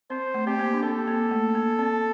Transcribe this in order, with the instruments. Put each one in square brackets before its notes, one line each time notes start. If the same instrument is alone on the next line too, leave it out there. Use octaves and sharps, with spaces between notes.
[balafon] C4 [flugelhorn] C5
[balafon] A3
[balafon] C4 [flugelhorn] G4
[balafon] A#3
D4
[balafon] C4 [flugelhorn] A4
[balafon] A#3
A3
A#3
C4